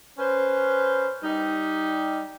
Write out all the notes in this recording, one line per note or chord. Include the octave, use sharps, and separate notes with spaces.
C#4 B4 C5
G3 D#4